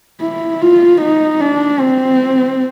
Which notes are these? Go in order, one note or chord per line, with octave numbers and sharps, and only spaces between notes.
E4
F4
D#4
D4
C4